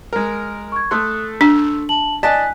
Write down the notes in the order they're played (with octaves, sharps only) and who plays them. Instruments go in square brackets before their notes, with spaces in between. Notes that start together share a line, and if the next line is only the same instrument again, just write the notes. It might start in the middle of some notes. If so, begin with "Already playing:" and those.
[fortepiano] G#3 A#4
[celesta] C#6 G#6
[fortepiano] A3 A4 C6 [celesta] D#6 F#6
[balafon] D4 [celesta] E6
[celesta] A5 F#7
[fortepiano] D5 D#5 A5 [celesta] G#5 F#6 B6